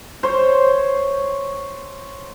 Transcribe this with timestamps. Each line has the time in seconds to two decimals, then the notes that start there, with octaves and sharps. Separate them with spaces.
0.23 C5 C#5